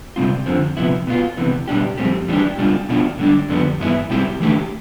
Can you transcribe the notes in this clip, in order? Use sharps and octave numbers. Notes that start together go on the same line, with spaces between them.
C3 G3 C4 F4
F2 D3 F3 C4
C3 F3 B3 E4
B2 B3 F4
C3 E3 B3
B2 G3 D4 G4
F2 E3 G3 C4 G4
E3 G3 B3 D4 G4
B2 G3 D4 F4
B2 B3 D4 F4
D3 G3 D4
F2 D3 G3 B3
G2 E3 B3 E4
B2 G3 C4 E4 G4
E3 A3 D4 G4